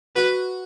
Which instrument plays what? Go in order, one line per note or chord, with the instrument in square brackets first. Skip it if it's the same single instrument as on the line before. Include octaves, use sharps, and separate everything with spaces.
[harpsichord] F#4 [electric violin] B4